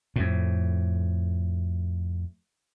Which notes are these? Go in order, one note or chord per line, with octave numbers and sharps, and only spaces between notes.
F2 A2